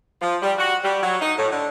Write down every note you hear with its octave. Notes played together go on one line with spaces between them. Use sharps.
F3
G3
F#4
G3
F#3
D#4
A2
D3